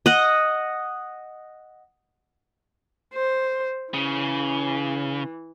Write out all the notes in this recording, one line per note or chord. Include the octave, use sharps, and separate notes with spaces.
D#5 F#5
C5
C#3 E3